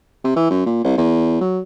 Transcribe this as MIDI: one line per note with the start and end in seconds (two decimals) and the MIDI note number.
0.25 0.32 48
0.36 0.48 52
0.50 0.63 42
0.66 0.82 46
0.84 0.96 36
0.98 1.37 40
1.41 1.60 54